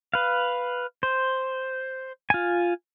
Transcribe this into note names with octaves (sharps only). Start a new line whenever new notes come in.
B4 F5
C5
F4 G#5